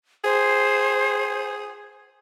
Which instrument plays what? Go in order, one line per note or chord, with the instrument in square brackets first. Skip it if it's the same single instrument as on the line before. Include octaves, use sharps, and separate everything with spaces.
[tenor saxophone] G#4 [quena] C5